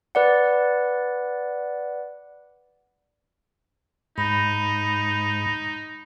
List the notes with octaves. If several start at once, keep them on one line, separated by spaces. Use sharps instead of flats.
B4 D5 F#5
G#2 D#4 B5